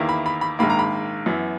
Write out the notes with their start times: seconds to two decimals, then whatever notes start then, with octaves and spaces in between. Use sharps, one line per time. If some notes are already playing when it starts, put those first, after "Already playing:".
Already playing: E2 D#3 A#3 E4
0.09 B5
0.26 B5
0.41 B5
0.59 A#1 G#2 D#3 A#3 B5
0.70 A#5
0.79 B5
1.26 F#2 E3 B3 E4